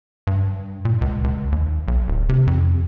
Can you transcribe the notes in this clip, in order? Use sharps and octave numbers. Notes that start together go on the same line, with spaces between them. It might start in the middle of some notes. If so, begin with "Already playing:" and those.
G2
A#2
C#2
C#2
D#2
B1
D1
C3
F2